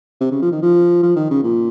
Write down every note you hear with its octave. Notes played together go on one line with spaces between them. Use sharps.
C3
C#3
F3
D#3
F3
F3
D#3
C#3
A#2